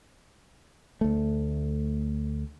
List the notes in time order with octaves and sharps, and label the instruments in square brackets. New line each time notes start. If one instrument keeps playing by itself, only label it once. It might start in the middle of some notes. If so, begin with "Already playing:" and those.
[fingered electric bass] D2 A3